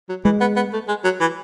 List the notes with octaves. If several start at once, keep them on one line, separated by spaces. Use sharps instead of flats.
F#3
E3 G#3
B3
B3
A3
G#3
F#3
E3